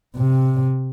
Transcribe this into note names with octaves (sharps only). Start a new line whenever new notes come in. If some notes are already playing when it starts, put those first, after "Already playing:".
C3